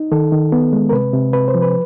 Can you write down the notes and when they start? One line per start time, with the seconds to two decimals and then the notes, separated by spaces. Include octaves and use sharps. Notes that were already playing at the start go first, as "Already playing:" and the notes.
Already playing: D#4
0.12 D#3 A4
0.32 D#3
0.52 B3
0.73 G#3
0.89 A#4
0.93 C3 B4
1.13 C3
1.33 C3 B4
1.48 C5
1.54 F3
1.62 B4